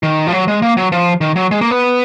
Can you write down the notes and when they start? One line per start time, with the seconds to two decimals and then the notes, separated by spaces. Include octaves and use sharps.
0.03 D#3
0.27 F3
0.33 F#3
0.48 G#3
0.62 A#3
0.77 F#3
0.92 F3
1.21 D#3
1.36 F#3
1.51 G#3
1.61 A#3
1.71 B3